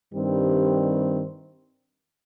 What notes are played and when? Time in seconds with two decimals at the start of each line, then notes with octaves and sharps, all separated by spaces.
0.12 G2 D#3 G3 C4